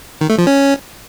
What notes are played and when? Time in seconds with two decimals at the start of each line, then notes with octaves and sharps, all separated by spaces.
0.21 D#3
0.30 A3
0.38 F3
0.47 C#4